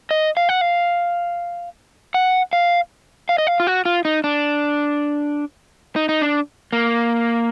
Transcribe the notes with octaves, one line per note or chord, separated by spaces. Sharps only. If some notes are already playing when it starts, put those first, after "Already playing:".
D#5
F5
F#5
F5
F#5
F5
F5
D#5
F5
F4
F#4
F4
D#4
D4
D#4
D#4
D4
A#3